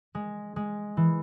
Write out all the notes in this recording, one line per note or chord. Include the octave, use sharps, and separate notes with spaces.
G#3
G#3
E3